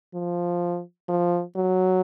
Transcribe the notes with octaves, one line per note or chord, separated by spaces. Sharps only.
F3
F3
F#3